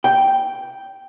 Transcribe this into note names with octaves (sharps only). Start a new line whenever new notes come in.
G5